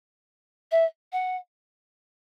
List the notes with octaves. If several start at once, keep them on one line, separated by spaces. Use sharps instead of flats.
E5
F#5